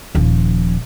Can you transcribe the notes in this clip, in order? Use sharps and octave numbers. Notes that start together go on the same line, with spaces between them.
D#1 F3